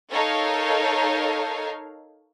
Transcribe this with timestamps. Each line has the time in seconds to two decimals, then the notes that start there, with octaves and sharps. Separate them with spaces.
0.12 D#4 A4 A#4 C#5 F5